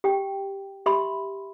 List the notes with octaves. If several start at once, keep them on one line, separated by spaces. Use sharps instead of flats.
G4 G5
G4 E5 B5 C6